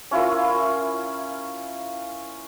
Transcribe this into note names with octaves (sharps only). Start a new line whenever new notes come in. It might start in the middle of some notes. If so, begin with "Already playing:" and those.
C#4 E4 F4 A#4